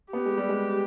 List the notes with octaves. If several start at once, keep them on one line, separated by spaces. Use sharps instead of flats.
B3 G4
G#3
G3
G#3